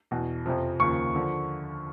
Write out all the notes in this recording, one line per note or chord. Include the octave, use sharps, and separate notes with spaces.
E2 B2
F2 C3 F3
D#2 C#3 F3 C#6
D3 F3